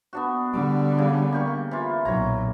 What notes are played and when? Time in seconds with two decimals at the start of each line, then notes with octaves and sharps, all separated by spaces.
0.13 B3 D4 F#4
0.53 D3 G3 D6
0.98 C#3
1.32 A#3 G4 C#6
1.71 E3 F4
2.05 B1 A#2 C#5 A#5